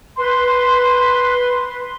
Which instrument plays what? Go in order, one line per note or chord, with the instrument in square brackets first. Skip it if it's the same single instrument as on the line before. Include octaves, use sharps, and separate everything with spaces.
[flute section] B4 C6